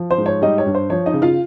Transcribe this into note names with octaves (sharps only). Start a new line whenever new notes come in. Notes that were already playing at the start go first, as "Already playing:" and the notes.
Already playing: F3
C5
G#2
C#5
G3 D#4 D#5
C#5
G2
C5
F3 C#5
D#4 D#5
C#3
F4 F5